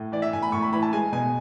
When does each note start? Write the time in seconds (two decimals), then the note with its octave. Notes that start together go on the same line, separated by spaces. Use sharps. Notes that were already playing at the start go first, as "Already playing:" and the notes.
Already playing: A2
0.12 E3 D5
0.22 E5
0.33 A2 G#5
0.43 B5
0.52 A2 C#6
0.62 B5
0.73 E3 B5
0.82 A5
0.93 G#3 G#5
1.12 B2 G#5